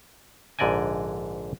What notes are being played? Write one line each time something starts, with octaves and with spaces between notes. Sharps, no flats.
A#1 G#2 D3 D5 D#5 G#5